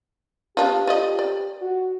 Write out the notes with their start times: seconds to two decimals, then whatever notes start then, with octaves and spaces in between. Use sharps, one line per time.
0.57 B3 D4 F4 G4
0.87 F4 D5 D#5
1.19 D5
1.61 F#4